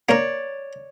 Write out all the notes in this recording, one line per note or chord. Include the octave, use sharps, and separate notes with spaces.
A#3 A#4 C#5 D5